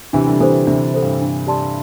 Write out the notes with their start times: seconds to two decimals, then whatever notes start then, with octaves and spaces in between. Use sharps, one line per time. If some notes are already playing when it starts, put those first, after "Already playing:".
0.13 C3 E3 D4
0.27 D3 G3
0.40 C3 E3 A4 C5
0.67 C3 E3 D4
0.94 A4 C5
1.02 G2
1.21 D4
1.47 G4 D5 A5 C6